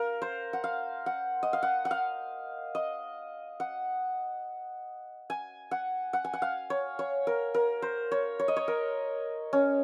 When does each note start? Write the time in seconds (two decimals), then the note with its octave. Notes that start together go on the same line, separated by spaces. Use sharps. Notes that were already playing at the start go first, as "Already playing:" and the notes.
Already playing: A#4 F5
0.22 C5
0.53 F#5
0.64 F5
1.06 F#5
1.43 D#5
1.53 F5
1.63 F#5
1.85 F#5
1.91 F5
2.75 D#5
3.60 F#5
5.30 G#5
5.71 F#5
6.13 F#5
6.25 G#5
6.33 F#5
6.42 F5
6.70 C#5
6.99 C#5
7.27 A#4
7.54 A#4
7.82 C5
8.12 C#5
8.39 C#5
8.48 D#5
8.56 C#5
8.68 A#4
9.53 C#4